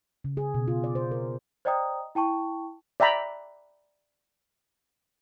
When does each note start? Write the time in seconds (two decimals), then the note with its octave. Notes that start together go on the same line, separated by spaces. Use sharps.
0.24 C#3
0.37 G#4
0.54 B2
0.68 F4
0.84 D5
0.95 C5
1.11 A#4
1.65 C5 D5 D#5 G5 A#5 D#6
2.15 E4 G5 A5 C#6
3.00 D5 E5 G5 A#5 B5